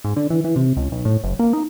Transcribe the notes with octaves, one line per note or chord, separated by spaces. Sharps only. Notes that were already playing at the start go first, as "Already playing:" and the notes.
G#2
D3
E3
E3
C3
C#2
B1
A2
F#1
A#3
D#4